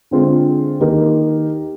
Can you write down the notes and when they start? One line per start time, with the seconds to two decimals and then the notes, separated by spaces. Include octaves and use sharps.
0.11 D3 G#3 C4 F4
0.80 D#3 A#3 D#4 G4 A#4